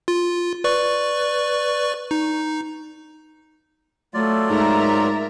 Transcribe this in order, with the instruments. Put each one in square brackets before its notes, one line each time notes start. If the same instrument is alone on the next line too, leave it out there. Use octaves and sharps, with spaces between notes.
[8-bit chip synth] F4
B4 D5 C#6
D#4
[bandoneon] F#3 F4 D5 [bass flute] A3
[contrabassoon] G#2 [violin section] A#4 E5 A#5